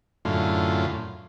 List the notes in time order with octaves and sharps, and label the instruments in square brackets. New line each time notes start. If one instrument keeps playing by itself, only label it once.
[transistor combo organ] F#2 A2 D3 F4